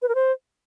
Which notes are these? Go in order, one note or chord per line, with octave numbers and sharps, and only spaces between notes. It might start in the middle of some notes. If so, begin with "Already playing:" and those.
B4
A#4
C5